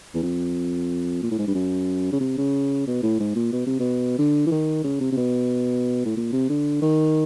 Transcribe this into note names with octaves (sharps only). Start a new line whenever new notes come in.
E2
F2
A#2
A2
G#2
G2
F#2
C#3
C3
C#3
B2
A2
G#2
A#2
B2
C3
B2
D3
E3
D#3
C#3
C3
C3
B2
A2
A#2
C3
D3
D#3